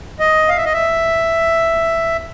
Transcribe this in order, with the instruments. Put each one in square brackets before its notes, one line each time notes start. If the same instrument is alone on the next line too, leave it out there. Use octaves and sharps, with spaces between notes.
[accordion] D#5
F5
E5
D#5
E5